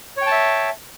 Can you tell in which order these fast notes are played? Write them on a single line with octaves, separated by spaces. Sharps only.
C#5 G5 A5 E5